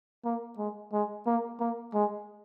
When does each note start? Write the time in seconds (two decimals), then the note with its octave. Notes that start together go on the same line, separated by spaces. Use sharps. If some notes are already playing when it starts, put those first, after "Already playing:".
0.25 A#3
0.58 G#3
0.93 G#3
1.26 A#3
1.60 A#3
1.94 G#3